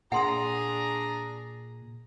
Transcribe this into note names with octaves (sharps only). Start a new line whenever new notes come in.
A#2 D4 G#4 F#5 A#5 C6 D#6